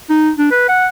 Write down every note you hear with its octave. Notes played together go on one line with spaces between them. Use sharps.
D#4
D4
B4
F#5